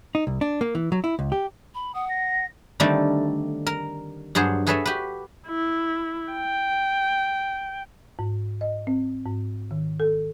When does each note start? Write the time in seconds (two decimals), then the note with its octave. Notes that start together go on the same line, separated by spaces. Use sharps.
0.15 D#4
0.27 C2
0.41 D4
0.61 A#3
0.75 E3
0.92 F#3
1.04 E4
1.19 C#2
1.32 G4
1.75 B5
1.95 F#5 D#6
2.09 A#6
2.80 D3 D#3 G3 A3 C4 D4
3.67 A#4
4.35 G2 F#3 G#4 C5 F#5
4.67 F#4 G#4 A4 B4 C#5 E5
4.86 F#4 G4 B4
5.47 E4
6.33 G5
8.19 G#2
8.61 D#5
8.87 C4
9.26 G#2
9.71 D#3
10.00 A4